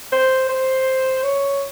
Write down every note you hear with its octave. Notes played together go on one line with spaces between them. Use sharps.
C5
C5
C#5